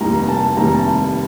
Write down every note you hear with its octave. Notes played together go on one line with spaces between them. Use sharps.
F1 D#2 D#3 G3 A#5
A5
F1 D#2 D#3 G3 A#5
A5